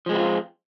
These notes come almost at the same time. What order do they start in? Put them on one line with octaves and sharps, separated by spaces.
F3 G#3 C4 E4 F4